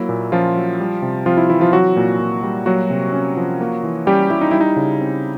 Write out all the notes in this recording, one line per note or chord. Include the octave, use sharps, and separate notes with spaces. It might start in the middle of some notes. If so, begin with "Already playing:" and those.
Already playing: F#3 A#3 E4
A#2
F3 C#4 F4
F#3
G3
C3
F3 C4 F4
E4
E3 E4
F3 F4
F#3 C4 F#4
A#2
A#2
G3
F#3 A#3 F#4
C3
C#4
F3
A#3
E3
G3 C#4 G4
G3 E4
D#4
G3 E4
D#4
C#3
C4